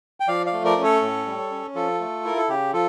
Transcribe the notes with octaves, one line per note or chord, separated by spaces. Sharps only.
G5
F3 D5 F5
D5 F5
A3
A#4 D5
C#4
A4 C#5
A2
G3
C#4
F3 F4 A4
A3
E4 A#4
A4
C#3 G4
F3 F4 A4